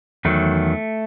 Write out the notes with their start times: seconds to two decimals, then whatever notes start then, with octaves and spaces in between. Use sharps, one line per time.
0.25 E2 D#3 F#3 A3